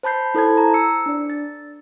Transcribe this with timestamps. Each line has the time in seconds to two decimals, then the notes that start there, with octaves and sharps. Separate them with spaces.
0.03 C5 A5 B5 G6 C7
0.35 E4 A4 C5 A5 G#6
0.57 A#5
0.74 E6 C#7
1.06 D4 D5
1.30 A6